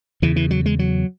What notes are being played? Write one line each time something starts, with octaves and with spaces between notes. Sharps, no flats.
E2 C#3 E3
E3
F#3
G#3
F#3